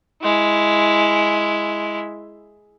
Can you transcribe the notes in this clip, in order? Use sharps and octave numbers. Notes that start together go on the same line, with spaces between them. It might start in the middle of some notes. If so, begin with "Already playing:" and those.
G#3 E4